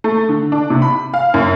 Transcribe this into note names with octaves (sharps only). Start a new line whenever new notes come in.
A3
D3
D4
C3
B5
F5
F#2